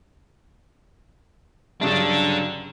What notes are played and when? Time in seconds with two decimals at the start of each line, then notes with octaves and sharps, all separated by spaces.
1.81 G2 C#3 F#3 D4 A4